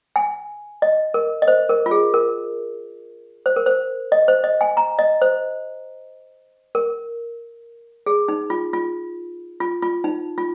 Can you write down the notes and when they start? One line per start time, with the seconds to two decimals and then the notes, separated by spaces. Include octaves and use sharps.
0.16 G#5
0.82 D#5
1.14 A#4
1.42 D#5
1.48 C5
1.69 A#4
1.86 F4
1.91 G#4
2.14 A#4
3.46 C5
3.56 A#4
3.66 C5
4.12 D#5
4.28 C5
4.44 D#5
4.61 G#5
4.77 A#5
4.99 D#5
5.22 C5
6.75 A#4
8.06 G#4
8.28 D#4
8.50 F4
8.73 F4
9.60 F4
9.82 F4
10.04 D#4
10.38 F4